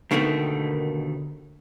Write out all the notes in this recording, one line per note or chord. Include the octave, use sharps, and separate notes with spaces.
D#2 B2 D3 D#3 G3 A3